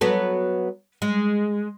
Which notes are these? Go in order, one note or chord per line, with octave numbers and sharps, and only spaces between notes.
F#3 B3 A4
G#3